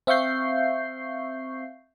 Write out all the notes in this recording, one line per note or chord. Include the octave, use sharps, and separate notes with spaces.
C4 E5 F5 C#6 G6 C7